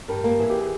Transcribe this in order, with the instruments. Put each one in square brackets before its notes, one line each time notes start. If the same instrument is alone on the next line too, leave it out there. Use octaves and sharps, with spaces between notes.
[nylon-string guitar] G2 [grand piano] A#4
[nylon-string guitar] A#3
[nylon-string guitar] E3 [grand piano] G#4
[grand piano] G4
G#4